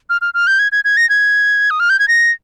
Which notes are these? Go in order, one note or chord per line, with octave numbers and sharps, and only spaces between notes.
F6
F6
F6
G6
G#6
G#6
G#6
A#6
G#6
D#6
F6
G6
G#6
A#6